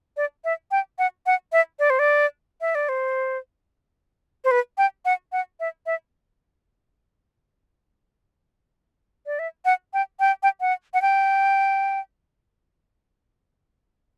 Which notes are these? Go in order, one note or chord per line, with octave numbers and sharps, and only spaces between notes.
D5
E5
G5
F#5
F#5
E5
D5
C5
D5
E5
D5
C5
C5
B4
G5
F#5
F#5
E5
E5
D5
E5
F#5
G5
G5
G5
F#5
F#5
G5